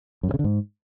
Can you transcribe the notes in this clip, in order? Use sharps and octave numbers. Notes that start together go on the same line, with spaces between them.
F#2
G2
C#3
D3
G#2